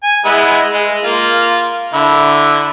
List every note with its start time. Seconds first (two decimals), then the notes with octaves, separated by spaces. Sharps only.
0.03 G#5
0.25 G#3 B3 E4
0.73 G#3
1.04 A#3 F4
1.93 D3 E4